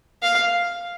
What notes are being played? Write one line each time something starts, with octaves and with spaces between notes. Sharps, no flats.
F5